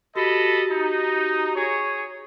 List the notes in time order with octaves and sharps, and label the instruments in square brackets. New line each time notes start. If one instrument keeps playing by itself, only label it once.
[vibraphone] F#4 G4 [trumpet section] A4 D#5 B5
[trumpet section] D#4
G#4 C#5